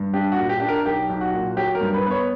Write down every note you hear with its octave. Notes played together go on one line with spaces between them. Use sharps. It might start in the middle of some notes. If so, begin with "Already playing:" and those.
Already playing: G2
D4 G4
F#4
A#2
G4
D4 G4
A#4
B1 G4
B1
F#4
A#2
F#3 G4
A#4
G2
B4
B3 B4
C#5